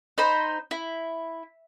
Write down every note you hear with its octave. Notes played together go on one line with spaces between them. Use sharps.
D#4 C5 B5
E4